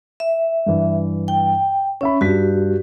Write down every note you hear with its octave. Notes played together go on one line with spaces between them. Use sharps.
E5
G2 E3
G5
C#4 C#5 E5 B5
G2 F#4 G4 B6